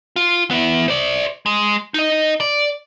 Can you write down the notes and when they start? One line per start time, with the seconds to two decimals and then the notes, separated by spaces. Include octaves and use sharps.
0.16 F4
0.51 B3 E4
0.88 C5 D5
1.46 G#3
1.94 D#4 D#5
2.40 D5